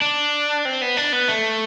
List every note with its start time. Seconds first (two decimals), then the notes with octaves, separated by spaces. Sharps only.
0.02 D4
0.65 C4
0.82 B3
0.97 D4
1.12 B3
1.28 A3